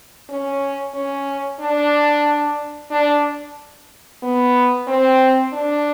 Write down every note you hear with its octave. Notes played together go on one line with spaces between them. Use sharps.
C#4
C#4
D4
D4
B3
C4
D4